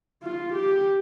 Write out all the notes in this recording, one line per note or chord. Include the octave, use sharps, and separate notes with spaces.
F4
G4